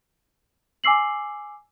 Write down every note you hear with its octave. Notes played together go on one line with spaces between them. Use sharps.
G#5 D6 E6 C7 F#7